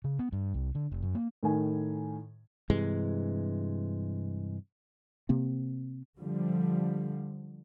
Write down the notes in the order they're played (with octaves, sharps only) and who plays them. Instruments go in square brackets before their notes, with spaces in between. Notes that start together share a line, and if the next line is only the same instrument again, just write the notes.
[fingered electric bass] C#3
B3
G2
C2
D3
F1
F#2
A#3
[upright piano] A2 D#3 G#5
[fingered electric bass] G2 C3 E3 G#3
[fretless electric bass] C3 A#3 C4
[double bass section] D3 F3 G3